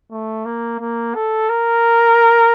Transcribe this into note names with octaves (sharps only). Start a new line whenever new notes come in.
A3
A#3
A#3
A4
A#4